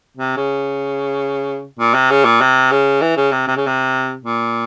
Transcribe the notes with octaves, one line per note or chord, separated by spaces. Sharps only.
C3
C#3
A#2
C3
C#3
A#2
C3
C#3
E3
C#3
C3
C3
C#3
C3
A#2